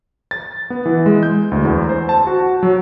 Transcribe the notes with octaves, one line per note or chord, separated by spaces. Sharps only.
A6
B3
E3
G#3
G6
D2
E2
C5
A5
F#4
F#3